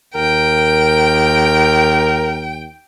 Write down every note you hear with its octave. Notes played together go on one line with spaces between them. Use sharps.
D#2 A#4 G5